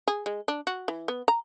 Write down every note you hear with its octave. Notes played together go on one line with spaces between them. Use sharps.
G#4
G#3
D4
F#4
E3
B3
A#5